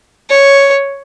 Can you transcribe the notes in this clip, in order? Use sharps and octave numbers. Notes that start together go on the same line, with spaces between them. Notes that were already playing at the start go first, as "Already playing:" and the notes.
C#5